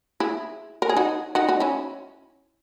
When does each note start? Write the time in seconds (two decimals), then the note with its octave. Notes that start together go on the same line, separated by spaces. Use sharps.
0.20 E4 G#4
0.82 A#4
0.89 G#4
0.97 D#4 F#4
1.35 D#4 F#4
1.48 D#4 F#4
1.60 C#4 E4